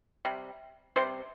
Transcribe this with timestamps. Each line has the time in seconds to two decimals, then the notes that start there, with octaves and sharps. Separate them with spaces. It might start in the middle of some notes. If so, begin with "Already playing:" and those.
0.25 C3 G3
0.96 C3 G3 C5